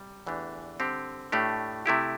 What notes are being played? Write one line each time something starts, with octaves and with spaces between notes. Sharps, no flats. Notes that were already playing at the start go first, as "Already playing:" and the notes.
Already playing: C3 G3
E2 E3 A3 D4 G4
D3 G3 C4 G4
A2 A3 D4 G4
C3 A3 E4 G4